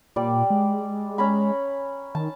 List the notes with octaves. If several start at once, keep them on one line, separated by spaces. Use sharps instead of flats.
A#2 G3 D5
G#3
C#4 A#5 B5
D#3 A5